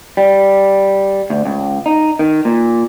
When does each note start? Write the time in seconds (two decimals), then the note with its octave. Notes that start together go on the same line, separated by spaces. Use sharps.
0.17 G3
1.30 D2
1.45 C#2
1.86 D#4
2.19 D#3
2.45 A#2